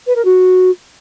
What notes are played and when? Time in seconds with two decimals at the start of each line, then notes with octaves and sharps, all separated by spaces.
0.07 B4
0.16 A#4
0.25 F#4